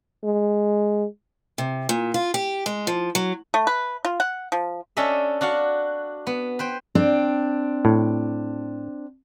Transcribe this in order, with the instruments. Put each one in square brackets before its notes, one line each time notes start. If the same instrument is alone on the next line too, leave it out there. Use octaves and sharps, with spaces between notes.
[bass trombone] G#3
[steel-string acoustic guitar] C3
A#2
F4
G4
G#3
F3
F#3
[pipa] A3
B4
F4
F#5
F3
[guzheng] C#4 D4 A4 D#5 E5
D4 F#4 F5 F#5
B3
B4 C5 G5
[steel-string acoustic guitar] C4 D4
[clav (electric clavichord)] A2